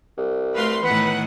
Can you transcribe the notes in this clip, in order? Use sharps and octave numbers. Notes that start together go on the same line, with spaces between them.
C2
A3 F#4 B4 F5 C6
A2 D#3 E3 B3 B4 F#5